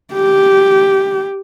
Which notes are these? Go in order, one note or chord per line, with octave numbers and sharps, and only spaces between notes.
G4